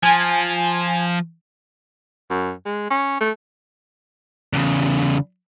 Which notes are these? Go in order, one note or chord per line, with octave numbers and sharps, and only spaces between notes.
F3 G#5
F#2
G#3
C#4
A3
E2 C#3